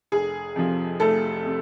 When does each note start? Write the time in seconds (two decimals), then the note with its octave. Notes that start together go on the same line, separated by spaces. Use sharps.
0.12 F1 G#4
0.56 F2 C3 F3
1.00 F1 A3 A4
1.46 C3